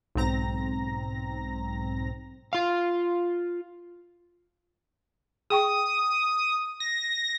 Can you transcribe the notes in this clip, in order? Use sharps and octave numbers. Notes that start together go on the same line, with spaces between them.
B1 G#2 C4 A#5 A#6
F4 F5
G#4 G5 C#6 D#6
A#6